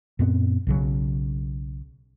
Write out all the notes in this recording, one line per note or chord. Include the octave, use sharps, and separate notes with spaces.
F#2 A#2 B3 C4
B1 C#3 F#3